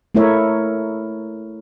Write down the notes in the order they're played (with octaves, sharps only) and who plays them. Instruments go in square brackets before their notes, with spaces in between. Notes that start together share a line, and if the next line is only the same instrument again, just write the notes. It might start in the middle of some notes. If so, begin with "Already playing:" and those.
[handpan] A3 A#3 E4 A#4 C#5 E5